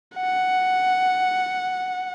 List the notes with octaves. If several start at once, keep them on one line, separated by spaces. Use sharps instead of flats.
F#5